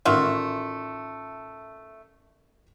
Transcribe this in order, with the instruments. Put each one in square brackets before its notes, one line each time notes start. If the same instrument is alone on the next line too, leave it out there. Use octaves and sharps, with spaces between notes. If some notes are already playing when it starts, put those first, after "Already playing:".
[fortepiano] A1 D#3 E5 [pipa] A3 F4 F#4